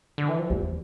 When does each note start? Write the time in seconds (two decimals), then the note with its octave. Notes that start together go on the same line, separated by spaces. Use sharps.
0.18 D3
0.29 E3
0.39 F3
0.50 E2 G3